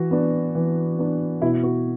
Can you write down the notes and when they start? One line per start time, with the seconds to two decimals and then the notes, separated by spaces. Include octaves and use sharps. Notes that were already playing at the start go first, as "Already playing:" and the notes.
Already playing: E3 F#4
0.11 B3 D4
0.55 E3
0.99 B3 D4
1.42 B2 E4
1.63 F#4